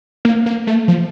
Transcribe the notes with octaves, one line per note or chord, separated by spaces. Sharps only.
A#3
A#3
A3
F3